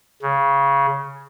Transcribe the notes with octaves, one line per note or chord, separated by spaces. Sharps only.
C#3